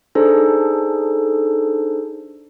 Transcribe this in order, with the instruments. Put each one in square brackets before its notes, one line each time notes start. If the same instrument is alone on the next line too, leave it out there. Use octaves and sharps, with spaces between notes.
[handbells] D4 D#4 G#4 A4 C5